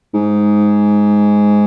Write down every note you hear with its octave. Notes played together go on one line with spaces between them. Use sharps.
G#2